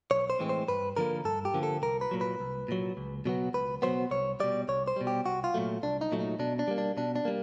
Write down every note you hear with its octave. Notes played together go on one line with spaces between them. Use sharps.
B1 C#5
C5
A2 E3 G#3 C4
C5
G2 B4
D3 F3 A#3 A#4
G2 A4
G4
D3 F3 A#3
A4
C2 A#4
B4
A#2 F#3
B4
C2
A#2 F#3
C#2
B2 F#3 B3
C#2 B4
B2 F#3 B3 C5
C2 C#5
B2 G3 D5
C2 C#5
C5
B2 G3
G4
C2 F#4
F4
A#2 F#3 A3
C2 D4
D#4
A#2 F#3 A3
D#4
B2 D4
D4
G3 A#3
D4
B2 D4
D4
G3 A#3